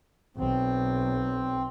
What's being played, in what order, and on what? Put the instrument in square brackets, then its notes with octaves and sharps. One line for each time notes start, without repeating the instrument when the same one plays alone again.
[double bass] B1 [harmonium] C4